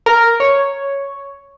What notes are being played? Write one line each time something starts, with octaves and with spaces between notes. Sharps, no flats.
A#4
C#5